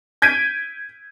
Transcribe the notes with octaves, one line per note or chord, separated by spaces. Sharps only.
G6 G#6 B6 D7 D#7